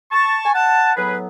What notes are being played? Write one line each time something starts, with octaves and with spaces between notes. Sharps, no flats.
A5 C#6
G#5
F#5 A5
A2 F#3 B3 G#4 B4